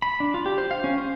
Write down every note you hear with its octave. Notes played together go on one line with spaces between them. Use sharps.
B5
D4
F4
G4
C5
F5
C#4
C5